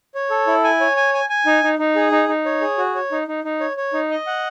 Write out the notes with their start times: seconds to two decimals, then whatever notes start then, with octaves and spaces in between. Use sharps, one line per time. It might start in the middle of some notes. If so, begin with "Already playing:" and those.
0.15 C#5
0.30 A4
0.47 E4
0.64 G#5
0.80 C#5
0.97 G#5
1.14 G#5
1.29 G#5
1.46 D#4
1.63 D#4
1.79 D#4
1.96 G#4
2.12 D#4
2.29 D#4
2.46 C#5
2.61 G#4
2.78 F#4
2.95 C#5
3.12 D#4
3.28 D#4
3.44 D#4
3.60 C#5
3.77 C#5
3.93 D#4
4.10 D#5
4.27 F#5